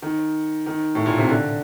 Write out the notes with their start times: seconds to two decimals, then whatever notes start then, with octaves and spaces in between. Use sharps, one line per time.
0.02 D#3
0.66 D#3
0.95 A2
1.06 A#2
1.18 C3
1.28 D3